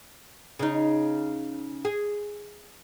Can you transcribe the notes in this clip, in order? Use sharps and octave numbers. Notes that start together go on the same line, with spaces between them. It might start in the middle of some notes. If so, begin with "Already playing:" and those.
C#3 D#4
G#4